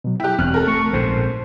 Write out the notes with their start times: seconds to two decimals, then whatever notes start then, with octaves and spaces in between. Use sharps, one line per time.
0.04 B2 F#3
0.20 E4 G4 G5 F#6
0.38 E1 E2 C4 F6 F#6
0.54 A4 A#4
0.67 A3 C#6
0.93 A#1 G#2 B2 C5